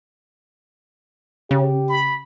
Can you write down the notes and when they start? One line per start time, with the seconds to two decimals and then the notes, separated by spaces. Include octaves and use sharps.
1.51 C#3 G4
1.89 B5